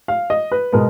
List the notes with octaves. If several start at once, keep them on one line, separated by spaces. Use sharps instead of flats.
F5
D#5
B4
B2 G#3 B3 A#4